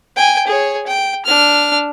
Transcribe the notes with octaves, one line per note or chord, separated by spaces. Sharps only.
G5 G#5
G#4 C#5
G5
D4 F6